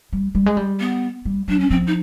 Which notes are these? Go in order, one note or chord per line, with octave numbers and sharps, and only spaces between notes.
G3
G3
G#3
G3
B3
G3
F#3 D4
C#4
F3 C4
D#4